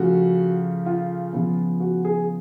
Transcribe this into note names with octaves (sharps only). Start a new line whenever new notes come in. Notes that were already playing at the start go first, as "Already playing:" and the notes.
Already playing: C#3 F3 A3 F#4
F4
C#3 F3 B3
F#4
G#4